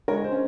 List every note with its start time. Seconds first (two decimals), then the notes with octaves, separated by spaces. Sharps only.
0.08 G#3 A#4 C#5
0.24 C5
0.32 C#4